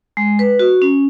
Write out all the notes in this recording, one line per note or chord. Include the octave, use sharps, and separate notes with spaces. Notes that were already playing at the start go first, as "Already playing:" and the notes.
G#3
B4
F#4
C#4